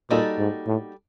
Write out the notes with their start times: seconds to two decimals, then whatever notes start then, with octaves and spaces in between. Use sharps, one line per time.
0.10 A#2 G3 A#3 D#4 F#4 A4
0.39 G#2
0.67 A2